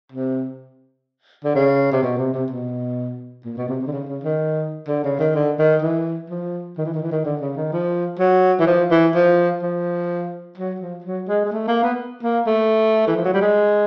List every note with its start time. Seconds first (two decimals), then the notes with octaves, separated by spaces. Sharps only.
0.12 C3
1.44 D3
1.55 C#3
1.92 C3
2.02 B2
2.18 C3
2.33 C3
2.50 B2
3.45 A#2
3.57 B2
3.69 C3
3.81 C3
3.87 D3
3.92 C#3
4.07 C#3
4.24 D#3
4.88 D3
5.04 C#3
5.19 D#3
5.35 D3
5.59 D#3
5.82 E3
6.30 F3
6.78 D#3
6.85 E3
6.94 D#3
7.03 E3
7.11 D#3
7.25 D3
7.41 C#3
7.57 D#3
7.72 F3
8.19 F#3
8.60 E3
8.67 F3
8.91 E3
9.15 F3
9.63 F3
10.58 F#3
10.80 F3
11.04 F#3
11.28 G#3
11.45 G#3
11.52 A3
11.68 A#3
11.83 B3
12.23 A#3
12.46 A3
13.07 E3
13.16 F3
13.25 F#3
13.34 G3
13.42 G#3